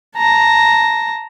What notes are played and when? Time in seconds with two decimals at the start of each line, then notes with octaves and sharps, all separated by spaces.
0.16 A5 A#5